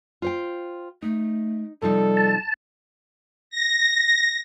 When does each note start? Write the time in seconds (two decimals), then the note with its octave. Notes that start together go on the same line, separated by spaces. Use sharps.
0.22 F4 C5 G5
1.02 A3 D#4
1.82 C3 F3 G3 D#4 A4
2.17 A5
3.50 A#6